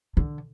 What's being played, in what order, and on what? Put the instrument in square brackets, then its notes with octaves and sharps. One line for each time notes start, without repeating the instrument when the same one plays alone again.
[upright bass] D3